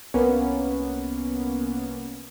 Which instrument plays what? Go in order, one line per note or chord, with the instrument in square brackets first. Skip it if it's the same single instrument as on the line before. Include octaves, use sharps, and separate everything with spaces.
[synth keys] C2 A#3 B3 C#4